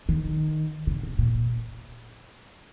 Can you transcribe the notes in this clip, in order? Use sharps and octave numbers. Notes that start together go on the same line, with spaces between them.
D#3
C3
C3
A#2